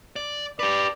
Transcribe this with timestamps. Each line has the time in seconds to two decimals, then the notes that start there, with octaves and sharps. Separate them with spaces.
0.16 D5
0.59 G4 B4 D5